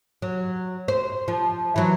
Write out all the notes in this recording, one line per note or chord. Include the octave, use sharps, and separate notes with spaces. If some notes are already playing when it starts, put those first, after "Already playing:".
F#3
C5
F3
E3 F#3